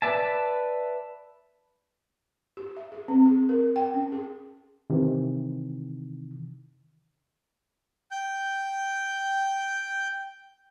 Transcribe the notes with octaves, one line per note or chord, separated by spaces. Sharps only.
B4 D5 E5 A5
G4
E5
G#4
C4
G#4
A#4
G5
C#4
G#4
C3 D#3 E3
G5 G6